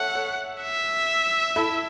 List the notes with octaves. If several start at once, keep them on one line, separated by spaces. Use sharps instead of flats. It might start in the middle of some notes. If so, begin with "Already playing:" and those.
Already playing: A4 C#5 E5 F#5
A4 C#5
E5
E4 A4